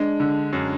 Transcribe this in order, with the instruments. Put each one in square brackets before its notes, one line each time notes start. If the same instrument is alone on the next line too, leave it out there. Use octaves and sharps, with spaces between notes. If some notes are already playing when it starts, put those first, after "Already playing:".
Already playing: [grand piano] G#3 [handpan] D4
[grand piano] D3
F#2